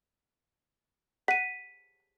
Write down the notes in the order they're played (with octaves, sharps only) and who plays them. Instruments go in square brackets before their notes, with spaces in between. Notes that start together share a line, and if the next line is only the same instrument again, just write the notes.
[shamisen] F#5 [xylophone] B6 D#7